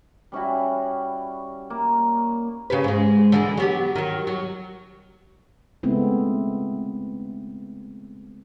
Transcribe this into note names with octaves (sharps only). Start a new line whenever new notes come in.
G3 C#4 E4 F#4
A#3
C#3 G4 B4
G#2 G#3
D3 E3 G#3
F#3 B3 G4
D#3 F#3
F#3
C#3 G#3 A3 B3 C4 E4